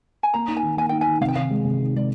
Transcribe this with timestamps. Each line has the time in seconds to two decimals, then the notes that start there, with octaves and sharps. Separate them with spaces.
0.23 G#5
0.34 A#3 A#5
0.48 D#4
0.57 G#5
0.63 D#3
0.77 A#3 G#5
0.89 D#4 G5
1.01 G#5
1.07 D#3
1.21 C3 F5
1.28 G5
1.35 D#3 F5
1.51 G#3
1.64 C3
1.79 D#3
1.94 G#3 D5